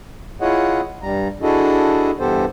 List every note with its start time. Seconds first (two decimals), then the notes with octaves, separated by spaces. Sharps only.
0.41 E4 F4 G#4 C#5 D#5 F#5
1.02 G2 G3 A#5
1.42 D4 E4 F#4 G#4 A4 D#5
2.19 G2 E3 B3 G4 A4 C5